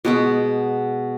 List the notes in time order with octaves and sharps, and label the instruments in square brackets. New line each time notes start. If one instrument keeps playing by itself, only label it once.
[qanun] B2 G#3 B3